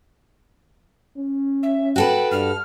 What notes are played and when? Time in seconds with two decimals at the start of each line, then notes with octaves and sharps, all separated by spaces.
1.17 C#4
1.63 E5
1.96 F#4 A4 B4 G5
2.31 G2 F6